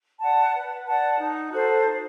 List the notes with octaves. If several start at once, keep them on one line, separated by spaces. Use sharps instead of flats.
D5 F#5 A5
B4
D5 F#5 A5
D#4
F#4 A4 C5
D#4